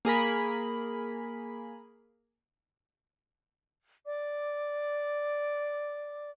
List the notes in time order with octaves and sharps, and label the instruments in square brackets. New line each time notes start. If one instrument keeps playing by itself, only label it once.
[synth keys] A#3 G#4 A#4 B5
[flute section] D5 D6